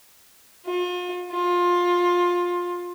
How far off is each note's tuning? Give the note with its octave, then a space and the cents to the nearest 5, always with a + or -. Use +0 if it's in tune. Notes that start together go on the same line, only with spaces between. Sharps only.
F4 +40
F4 +15